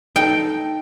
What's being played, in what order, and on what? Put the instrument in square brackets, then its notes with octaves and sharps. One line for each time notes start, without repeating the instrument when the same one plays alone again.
[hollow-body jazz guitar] D#4 A4 [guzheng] G5